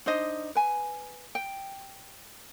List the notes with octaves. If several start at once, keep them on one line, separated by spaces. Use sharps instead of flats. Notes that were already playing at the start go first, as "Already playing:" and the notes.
D4 D#4 C5 D#5
B4 G#5
G5